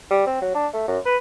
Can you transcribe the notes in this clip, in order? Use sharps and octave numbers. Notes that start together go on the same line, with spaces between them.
G3
C4
F#3
D4
A3
F#2
B4